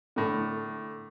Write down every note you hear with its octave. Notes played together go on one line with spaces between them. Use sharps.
A2 D3